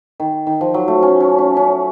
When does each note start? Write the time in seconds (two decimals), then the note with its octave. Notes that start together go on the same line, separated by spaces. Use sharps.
0.20 D#3
0.47 D#3
0.61 F3
0.74 F#3
0.88 A3
1.03 C#4
1.20 C#4
1.38 C#4
1.57 C#4